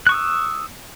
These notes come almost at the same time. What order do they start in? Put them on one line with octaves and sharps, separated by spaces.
F#6 C#6 D#6 E6